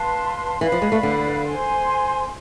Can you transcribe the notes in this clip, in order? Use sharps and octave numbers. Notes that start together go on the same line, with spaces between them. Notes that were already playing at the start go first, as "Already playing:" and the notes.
Already playing: B4 F5 A5 C6
E3 B4 D5 F5 B5
F3
G#3
A3
D3
C5 G#5 C6